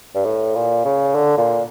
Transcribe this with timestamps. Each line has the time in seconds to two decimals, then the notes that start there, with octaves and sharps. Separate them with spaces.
0.15 G2
0.25 A2
0.55 A#2
0.85 C#3
1.15 D3
1.38 A#2